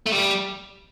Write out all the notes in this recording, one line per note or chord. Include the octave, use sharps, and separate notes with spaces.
A3
G3